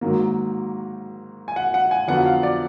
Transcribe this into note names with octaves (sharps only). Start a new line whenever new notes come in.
G#2 D#3 F#3 A#3
G#5
F#5
F#5
G#5
F2 D3 F#3 B3 F4 F#5
F5
D5